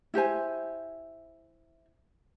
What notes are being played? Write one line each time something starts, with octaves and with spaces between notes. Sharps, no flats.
E4 G4 C5 G#5